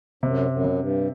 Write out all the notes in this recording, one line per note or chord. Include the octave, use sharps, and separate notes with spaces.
F#2 C3
F#2
C3
G2